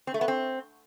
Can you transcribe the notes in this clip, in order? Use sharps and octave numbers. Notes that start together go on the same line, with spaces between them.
C4
A3
B3
C4